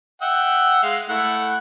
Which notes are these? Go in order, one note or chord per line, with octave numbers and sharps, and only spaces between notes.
E5 F#5 G5
G#3 F5
A3 E4 F#5